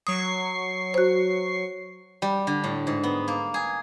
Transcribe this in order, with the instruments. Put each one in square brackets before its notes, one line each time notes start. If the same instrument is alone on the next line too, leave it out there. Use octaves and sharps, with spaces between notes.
[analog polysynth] F#3 C#6 C7 [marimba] D#6
[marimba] F#4 C5
[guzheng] G3
D3
A2
G#2
B3
A#3
G#4